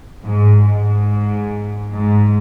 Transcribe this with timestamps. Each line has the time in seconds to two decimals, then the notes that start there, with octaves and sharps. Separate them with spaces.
0.23 G#2
0.66 G#2
1.92 G#2